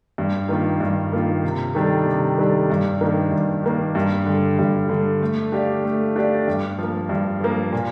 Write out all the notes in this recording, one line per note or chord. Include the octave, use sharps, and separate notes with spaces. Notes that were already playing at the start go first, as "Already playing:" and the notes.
G2
D#3 A#3 F4
G2
D#3 A#3 F4
C3
D#3 G3 D4 A4
C3
D#3 G3 D4 A4
G2
D#3 A#3 D4
G2
D#3 A#3 D4
G2
D3 G3
G2
D3 G3
A3
D4 G4 D5 F5
A3
D4 G4 D5 F5
G2
F3 A#3
G2
F3 A#3
A#2